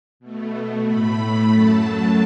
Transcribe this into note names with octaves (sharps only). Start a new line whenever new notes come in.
B2 A3
A2 A3 B5
F#2 F#3 A3 A5